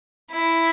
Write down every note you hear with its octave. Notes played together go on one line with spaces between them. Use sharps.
E4